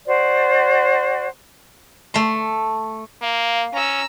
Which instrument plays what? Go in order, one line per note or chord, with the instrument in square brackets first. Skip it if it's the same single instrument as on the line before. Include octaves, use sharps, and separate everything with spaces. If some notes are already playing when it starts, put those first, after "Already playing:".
[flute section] F#4 C5 D5
[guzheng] A3 C6
[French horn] A#3 [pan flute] F5
[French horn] C#4 [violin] A#5 E6